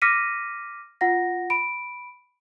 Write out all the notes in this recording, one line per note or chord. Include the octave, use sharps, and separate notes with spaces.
D6 F6 A#6 B6 C#7 D#7
F4 F#5 A#6
B5 D7